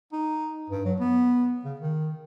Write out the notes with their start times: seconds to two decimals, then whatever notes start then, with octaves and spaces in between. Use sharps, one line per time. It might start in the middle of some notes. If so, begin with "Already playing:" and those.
0.13 D#4
0.70 G2
0.85 F#3
1.00 B3
1.65 C#3
1.80 D#3